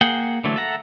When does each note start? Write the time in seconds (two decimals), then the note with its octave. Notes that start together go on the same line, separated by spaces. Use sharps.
0.01 A#3 G#4 F#5 G5
0.44 D3 E3 F#3 A3
0.56 A4 E5 F#5 A#5